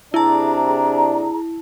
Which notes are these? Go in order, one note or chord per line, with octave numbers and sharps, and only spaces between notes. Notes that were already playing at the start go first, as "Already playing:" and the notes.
C3 D4 E4 G#4 A5 A#5